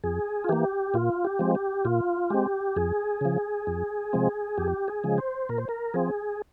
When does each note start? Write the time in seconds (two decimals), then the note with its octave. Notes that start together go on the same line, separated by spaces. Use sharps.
0.04 F2 G#4
0.44 F4
0.49 E3 A#3 G4
0.94 A#2 F4
1.25 G4
1.39 F3 G#3 C4
1.55 G4
1.85 A#2 F4
2.30 G#3 C4 G4
2.76 F2 G#4
3.21 C#3 F3
3.67 F2
4.13 C3 F3 G#3 C4
4.57 F2 G4
4.88 G#4
5.04 C#3 F3 G#3
5.18 C5
5.49 A#2 A#4
5.58 C5
5.69 A#4
5.94 F3 C4 G#4